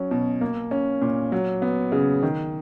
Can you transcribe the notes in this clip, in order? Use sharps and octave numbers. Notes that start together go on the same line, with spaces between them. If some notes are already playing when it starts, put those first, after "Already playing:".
Already playing: F#3 C#4
B2
A#3
C#4
A#2
F#3
B3
C#3
D#3